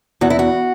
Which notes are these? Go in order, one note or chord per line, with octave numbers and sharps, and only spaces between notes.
E2 F#4
E4
F#4